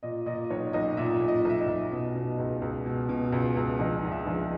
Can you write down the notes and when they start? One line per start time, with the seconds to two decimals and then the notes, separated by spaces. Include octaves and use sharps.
0.03 A#2 D#5
0.26 A#2 D#5
0.50 B1 C#5
0.73 B1 D#5
0.97 A#2 E5
1.21 A#2
1.28 D#5
1.45 B1 E5
1.60 D#5
1.68 B1
1.92 B2
2.15 B2
2.38 C#2
2.62 C#2
2.86 B2
3.09 B2
3.32 C#2
3.57 C#2
3.80 A#1 D#5
4.03 G#2
4.12 E5
4.27 A#1